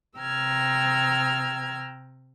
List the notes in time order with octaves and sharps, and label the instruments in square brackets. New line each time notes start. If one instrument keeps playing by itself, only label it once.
[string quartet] C3 G5 A#5 E6 F6 G#6